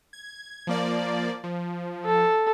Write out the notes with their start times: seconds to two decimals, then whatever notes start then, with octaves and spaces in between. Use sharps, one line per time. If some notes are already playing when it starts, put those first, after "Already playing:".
0.13 G#6
0.67 F3 A#3 D5
1.44 F3
2.06 A4